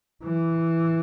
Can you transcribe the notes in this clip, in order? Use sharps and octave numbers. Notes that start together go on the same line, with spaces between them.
E3